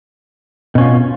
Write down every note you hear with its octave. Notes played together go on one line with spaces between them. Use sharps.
B2 C#4 F4